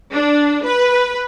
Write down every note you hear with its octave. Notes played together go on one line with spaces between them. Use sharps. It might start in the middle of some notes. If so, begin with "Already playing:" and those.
D4
B4